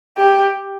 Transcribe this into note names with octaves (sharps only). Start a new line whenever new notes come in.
G4